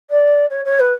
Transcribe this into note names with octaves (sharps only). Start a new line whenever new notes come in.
D5
C#5
C#5
B4